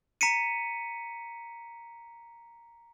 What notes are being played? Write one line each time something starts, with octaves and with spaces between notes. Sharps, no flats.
A#5 B6 C#7 D#7